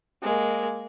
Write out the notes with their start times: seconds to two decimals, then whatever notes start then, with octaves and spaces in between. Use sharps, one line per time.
0.23 G#3 A#3